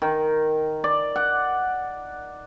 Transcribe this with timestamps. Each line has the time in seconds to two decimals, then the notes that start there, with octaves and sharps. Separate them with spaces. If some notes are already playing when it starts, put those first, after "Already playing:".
0.02 D#3
0.84 D5
1.16 F#5